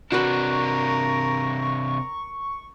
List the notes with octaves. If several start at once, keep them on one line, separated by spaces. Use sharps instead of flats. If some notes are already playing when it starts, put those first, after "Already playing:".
C3 D4 F#4 A#4 B4 C#6